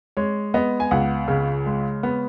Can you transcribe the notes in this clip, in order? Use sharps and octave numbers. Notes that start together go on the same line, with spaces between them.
G#3 C#5
B3 D#5
G#5
C#2 F#5
C#3
G#3
B3